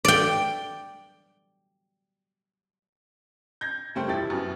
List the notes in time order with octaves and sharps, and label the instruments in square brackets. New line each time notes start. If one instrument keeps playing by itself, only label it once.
[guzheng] D5 G5
[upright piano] G6 G#6 A#6
F#1 G3 A3 C5 G5
E1 F3 E4 G4 A6
F#2 B2 F#3